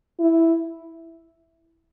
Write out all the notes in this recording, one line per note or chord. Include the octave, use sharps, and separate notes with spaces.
E4